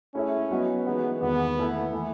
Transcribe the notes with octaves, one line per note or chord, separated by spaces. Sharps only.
A3 C#4 E4 G#4 C#5 E5
F#3 B3 F#4 B4 D#5
E3 G#3 B3 D#4 F#4 B4
E2 D#3 G#3 B3
D#3 A3 E4 A4
E3 A3 E4